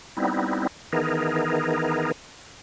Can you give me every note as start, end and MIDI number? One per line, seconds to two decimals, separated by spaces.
0.17 0.67 55
0.17 0.67 59
0.17 0.67 60
0.17 0.67 63
0.17 0.67 64
0.92 2.12 51
0.92 2.12 52
0.92 2.12 59
0.92 2.12 63
0.92 2.12 68
0.92 2.12 70